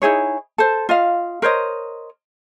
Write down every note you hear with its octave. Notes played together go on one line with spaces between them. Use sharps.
D#4 E4 G#4 C#5
A4 C5
F4 D#5 F5
A#4 C5 C#5 D#5